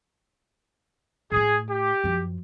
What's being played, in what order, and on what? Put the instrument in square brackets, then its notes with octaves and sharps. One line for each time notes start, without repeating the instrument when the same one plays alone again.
[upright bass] A2 A3 [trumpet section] G#4
[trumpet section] G4
[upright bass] F#2 F3